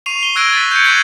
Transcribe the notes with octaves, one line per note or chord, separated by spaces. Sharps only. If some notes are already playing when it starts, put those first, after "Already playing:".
C#6 C7 D#7 F7
C7 G7
E6 F#6 G#6 A#6 D7 D#7
A6 B6
G6 C#7
C#6 F#6 G#6 C7 F#7